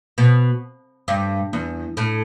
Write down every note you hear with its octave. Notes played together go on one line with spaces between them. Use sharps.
B2
G2
E2
A2